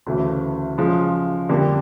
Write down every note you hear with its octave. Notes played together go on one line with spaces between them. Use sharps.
D2 C#3 E3 A3
C#3 F3 G#3
F2 D3 G3 A#3